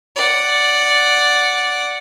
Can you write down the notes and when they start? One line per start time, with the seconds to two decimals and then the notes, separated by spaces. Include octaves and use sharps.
0.16 D5 F#5